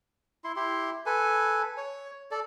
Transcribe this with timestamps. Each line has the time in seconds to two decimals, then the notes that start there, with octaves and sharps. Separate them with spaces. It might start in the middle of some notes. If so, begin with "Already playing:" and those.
0.44 E4 C6
0.56 E4 G4 C6
1.06 A4 B4 G#5
1.77 C#5
2.31 A4 D5